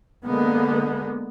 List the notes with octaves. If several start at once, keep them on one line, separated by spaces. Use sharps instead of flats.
D3 G#3 A#3 B3